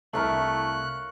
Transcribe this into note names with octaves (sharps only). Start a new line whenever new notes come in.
C2 A3 E4 A#4 C#5 F5 F#6